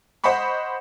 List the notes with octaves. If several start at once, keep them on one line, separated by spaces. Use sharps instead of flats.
C5 D#5 F#5 B5 C#6